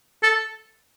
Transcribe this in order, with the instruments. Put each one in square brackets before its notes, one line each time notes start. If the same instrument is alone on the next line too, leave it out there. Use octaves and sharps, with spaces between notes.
[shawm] A4